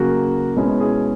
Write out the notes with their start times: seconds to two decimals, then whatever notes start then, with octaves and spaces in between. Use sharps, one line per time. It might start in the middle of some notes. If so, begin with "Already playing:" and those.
Already playing: C#3 F#3 A#3 F#4
0.56 B2 G#3 C#4 E4
0.81 G#4